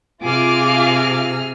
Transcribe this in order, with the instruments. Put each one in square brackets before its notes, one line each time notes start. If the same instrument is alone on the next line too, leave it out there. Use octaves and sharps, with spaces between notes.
[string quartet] C3 G#4 F6 [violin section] F4 D6